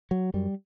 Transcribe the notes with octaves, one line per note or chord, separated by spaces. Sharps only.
F#3
F#2 G3